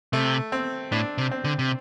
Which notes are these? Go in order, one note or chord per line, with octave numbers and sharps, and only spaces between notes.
C3 A3
C4
A2 D4
C3
C4
D3
C3